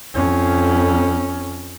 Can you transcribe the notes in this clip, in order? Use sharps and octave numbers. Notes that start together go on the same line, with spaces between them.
F2 C#4